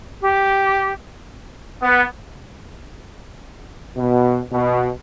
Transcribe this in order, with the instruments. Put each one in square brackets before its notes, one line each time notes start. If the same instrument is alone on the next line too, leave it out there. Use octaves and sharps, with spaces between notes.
[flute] G4
[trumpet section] B3
[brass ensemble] B2
B2